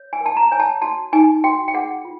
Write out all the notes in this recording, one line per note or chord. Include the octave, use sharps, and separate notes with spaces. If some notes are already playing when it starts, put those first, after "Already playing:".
Already playing: C#5
G#5
A#4
A5
A#5
C#5 G#5
A5
F#4 A5
D#4 G#5
F#4 G5
G5
G#4 F#5
F4